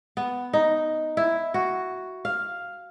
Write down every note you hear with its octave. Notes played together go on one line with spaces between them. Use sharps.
B3
D#4
E4
F#4
F5